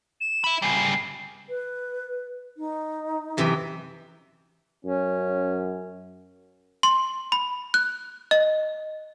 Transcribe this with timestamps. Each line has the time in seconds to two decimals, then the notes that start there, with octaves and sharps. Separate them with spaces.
0.21 E7
0.44 E5 B5
0.62 C#3 G3 C7
1.49 B4
2.57 D#4
3.37 F#2 C3 E3
4.85 F#2 C#4
6.83 C6
7.32 B5
7.74 F#6
8.31 D#5